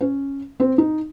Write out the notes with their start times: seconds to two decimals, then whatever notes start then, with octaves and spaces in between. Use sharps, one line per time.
0.01 C#4
0.60 C4
0.78 D#4